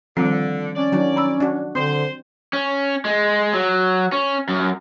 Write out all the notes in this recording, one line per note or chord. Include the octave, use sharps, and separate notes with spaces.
D3 D#3 F3 G3 C4
C#4 D5
D#3 F#3 D4
A#5 B5 E6
D4 F#4
D3 C4 C5
C#4
G#3
F#3
C#4
F#2